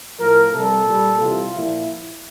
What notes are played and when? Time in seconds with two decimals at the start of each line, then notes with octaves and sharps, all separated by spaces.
0.19 A2 F3 A#4
0.53 C3 G3 A4
0.86 A#2 G3
1.20 C3 E3 G3 F4
1.53 A#2 F3 E4